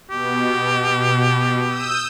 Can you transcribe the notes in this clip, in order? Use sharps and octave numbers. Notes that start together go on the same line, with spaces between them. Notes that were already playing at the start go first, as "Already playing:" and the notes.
B2 G4
D#6 E6 G6